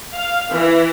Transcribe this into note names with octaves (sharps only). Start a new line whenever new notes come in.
F5
E3